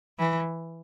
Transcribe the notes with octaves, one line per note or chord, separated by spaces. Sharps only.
E3